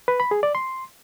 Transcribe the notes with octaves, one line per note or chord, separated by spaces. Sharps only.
B4
B5
G#4
D5
C6